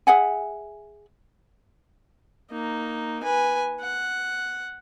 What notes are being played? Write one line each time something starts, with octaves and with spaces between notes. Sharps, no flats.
G#4 E5 F#5 G#5
A#3 D#4
B4 G#5
F#5